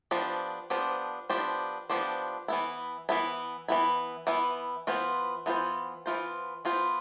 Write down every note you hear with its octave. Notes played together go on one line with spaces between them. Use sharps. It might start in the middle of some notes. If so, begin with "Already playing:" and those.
F3 B3 D4 G4 C5
F3 B3 D4 G4 C5
F3 B3 D4 G4 C5
F3 B3 D4 G4 C5
E3 B3 E4
E3 B3 E4
E3 B3 E4
E3 B3 E4
E3 B3 F4 C5
E3 B3 F4 C5
E3 B3 F4 C5
E3 B3 F4 C5